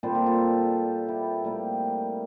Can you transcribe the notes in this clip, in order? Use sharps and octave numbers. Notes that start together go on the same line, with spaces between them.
A#2 G3 C4 A4 C5
G4 A#4
F4 A4
E4 G4
A2 G3 A#3